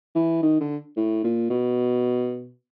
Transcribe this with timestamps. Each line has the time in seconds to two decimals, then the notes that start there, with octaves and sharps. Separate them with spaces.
0.15 E3
0.43 D#3
0.60 D3
0.97 A2
1.24 A#2
1.50 B2